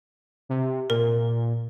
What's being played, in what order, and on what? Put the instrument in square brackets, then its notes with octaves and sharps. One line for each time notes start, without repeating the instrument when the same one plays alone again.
[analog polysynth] C3
[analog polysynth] A#2 [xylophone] A#4